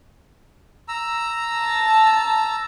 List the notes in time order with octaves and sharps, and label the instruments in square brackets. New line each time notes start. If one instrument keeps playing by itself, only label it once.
[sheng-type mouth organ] A#5 E6
[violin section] A5